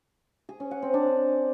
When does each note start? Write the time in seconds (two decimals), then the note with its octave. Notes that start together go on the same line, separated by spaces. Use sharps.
0.49 G#4
0.60 C#4
0.71 F#5
0.82 C4
0.94 D4